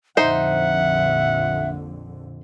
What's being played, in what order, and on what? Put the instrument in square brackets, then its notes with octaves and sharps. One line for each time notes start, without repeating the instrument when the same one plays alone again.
[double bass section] A#1 F2 D3 [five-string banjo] D#4 C5 [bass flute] E5 [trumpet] F#5